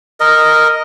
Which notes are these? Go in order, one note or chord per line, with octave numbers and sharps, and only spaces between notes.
A#4 D#5